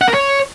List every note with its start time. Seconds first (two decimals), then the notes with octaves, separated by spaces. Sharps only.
0.01 F#5
0.08 A#4
0.14 C#5